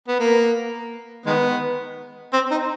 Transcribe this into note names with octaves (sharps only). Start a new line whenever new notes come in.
B3
A#3
D#3 G#3 B3
C4
D#4